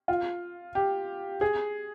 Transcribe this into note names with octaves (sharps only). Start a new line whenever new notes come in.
F4
G4
G#4